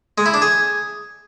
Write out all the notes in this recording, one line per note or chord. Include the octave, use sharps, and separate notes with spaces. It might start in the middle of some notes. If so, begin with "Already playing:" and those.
G#3
E4
D4
G#4